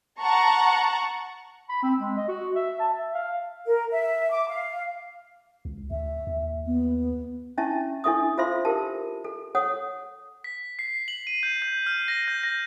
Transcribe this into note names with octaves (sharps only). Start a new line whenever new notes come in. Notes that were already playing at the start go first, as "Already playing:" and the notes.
F#5 A5 A#5 C#6
B5
C4
G#3
D#5
F#4
E5
A5
E5
F5
A#4
E5
D6
F5
C#2
D2 E5
D#2
B3
C#4 D4 E4 E5 A5 C#6
D4 E4 A4 E5 C#6 D#6
F4 A4 C5 E5 F5 C6
G4 A4 A#4 A5
A4
A4 C#5 F#5 D#6
B6
C7
F#7
D#7
G6
G6
F6
A#6
G6
A#6